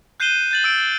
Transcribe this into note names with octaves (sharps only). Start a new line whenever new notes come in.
F#6 G6 C7 D#7 E7 G7
G6 A6 F#7
E6 D7